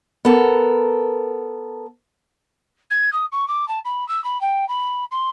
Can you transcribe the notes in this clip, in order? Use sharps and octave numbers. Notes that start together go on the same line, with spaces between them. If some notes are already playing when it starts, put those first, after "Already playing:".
B3 A4 A#4
G#6
D#6
C#6
D6
A5
B5
E6
B5
G5
B5
C6